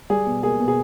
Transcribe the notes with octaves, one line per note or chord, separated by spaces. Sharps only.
G3 G#4
B2
A#3 G#4
B2
G#4